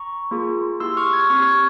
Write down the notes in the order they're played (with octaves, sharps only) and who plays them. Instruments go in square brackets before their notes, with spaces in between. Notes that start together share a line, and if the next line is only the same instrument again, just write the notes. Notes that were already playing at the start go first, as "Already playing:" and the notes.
Already playing: [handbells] A#5 C#6
A#3 F4 G#4
A#3 E4 G4 C6 E6
C#6 F6
F6 G#6
C4 G4 C#6 F6
F6 G#6